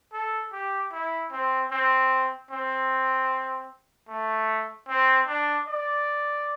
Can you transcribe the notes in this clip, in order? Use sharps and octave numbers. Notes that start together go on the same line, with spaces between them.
A4
G4
E4
C4
C4
C4
A3
C4
D4
D5